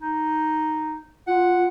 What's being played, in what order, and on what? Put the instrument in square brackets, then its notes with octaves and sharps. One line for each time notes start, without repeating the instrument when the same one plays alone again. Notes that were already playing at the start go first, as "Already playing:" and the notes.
[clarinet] D#4
[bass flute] F4 [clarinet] F#5